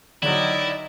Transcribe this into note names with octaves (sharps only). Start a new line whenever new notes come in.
D3 D#3 F#3 E4 D5 D#5